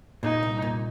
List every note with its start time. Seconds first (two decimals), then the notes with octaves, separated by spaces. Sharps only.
0.23 A#2 D#4
0.43 C2
0.62 A#2